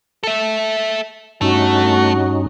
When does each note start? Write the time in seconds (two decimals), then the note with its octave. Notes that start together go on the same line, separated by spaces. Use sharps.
0.23 A4 E5
1.41 G2 A3 C#4 D#4 F#4